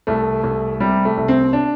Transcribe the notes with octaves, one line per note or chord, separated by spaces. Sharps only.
C2 A3
C2
C3 G3
A3
C2
C4
D4